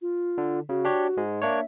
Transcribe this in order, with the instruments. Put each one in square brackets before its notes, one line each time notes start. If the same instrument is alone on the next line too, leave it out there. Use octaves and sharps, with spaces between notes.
[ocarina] F4
[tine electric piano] D3
[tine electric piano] C#3 [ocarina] F#4
[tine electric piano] D4 G4 C#5
G#2 G#3
[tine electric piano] A#3 D4 C#5 [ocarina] E5